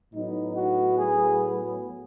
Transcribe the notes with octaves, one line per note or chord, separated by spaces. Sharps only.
A2 F#3 B3 D#4
F#4
G#4